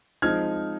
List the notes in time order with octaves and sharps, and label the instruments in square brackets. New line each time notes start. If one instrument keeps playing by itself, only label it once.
[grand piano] F3 G#3 C4 D#4 F6 G#6